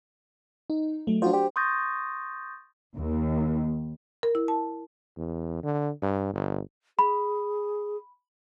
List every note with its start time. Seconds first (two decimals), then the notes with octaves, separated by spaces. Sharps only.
0.70 D#4
1.07 F#3 A3
1.22 F3 D4 F#4 C5
1.33 G4 C5
1.56 C6 C#6 D#6 G6 A6 A#6
2.97 D#2
4.23 A#4
4.35 E4
4.48 A5
5.17 E2
5.63 D3
6.02 G2
6.33 G1
6.99 G#4 B5